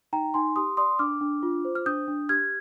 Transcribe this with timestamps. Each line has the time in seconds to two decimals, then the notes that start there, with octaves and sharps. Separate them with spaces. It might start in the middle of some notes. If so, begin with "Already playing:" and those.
0.13 D#4 G5 A#5
0.34 D#4 G#5 C6
0.56 G4 C6 D#6
0.77 D5 C6 D#6
0.99 D4 D6 F6
1.21 D4
1.43 F4
1.65 C5
1.75 F6
1.86 D4 D#6 G6
2.08 D4
2.29 G4 F6 G#6